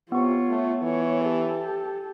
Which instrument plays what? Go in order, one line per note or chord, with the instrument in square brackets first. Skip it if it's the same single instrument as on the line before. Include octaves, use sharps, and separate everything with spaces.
[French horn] C3 [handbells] B3 C#6 [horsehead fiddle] F4 C#5
[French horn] A3
[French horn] E3 [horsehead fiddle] C#5
[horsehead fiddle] G4 A4